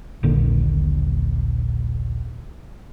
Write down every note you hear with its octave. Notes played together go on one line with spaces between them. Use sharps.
D#1 A#1 A#2 D3